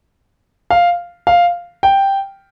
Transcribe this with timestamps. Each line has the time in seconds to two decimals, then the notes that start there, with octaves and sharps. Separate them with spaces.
0.71 F5
1.27 F5
1.83 G5